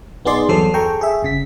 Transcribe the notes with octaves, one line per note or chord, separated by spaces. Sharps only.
B1 B3 D#4 G#4 D5 C6
E2 G2 F#3 A4 C5 C7
G#4 A4 G5 A#5 C#6
G#4 E5
G1 C#3 B6